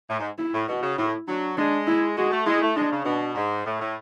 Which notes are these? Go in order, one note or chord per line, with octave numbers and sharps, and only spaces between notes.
A2
G#2
E4
A2
B2 F#4
C#3
A2 E4
F#3 D4
G#3 D4
E4
G#3 F#4
A3
G#3 E4
A3
G#3 D4
C#3
B2 D4
G#2
A2
A2